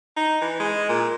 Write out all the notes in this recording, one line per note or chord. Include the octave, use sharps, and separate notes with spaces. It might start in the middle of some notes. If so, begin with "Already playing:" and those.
D#4
E3
G#3
A#2